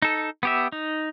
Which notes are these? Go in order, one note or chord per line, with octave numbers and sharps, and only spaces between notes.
D#4 A4
B3 G4 E5
D#4